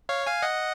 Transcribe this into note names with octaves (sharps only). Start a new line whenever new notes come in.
C#5 F5
F5 G#5
D#5 F#5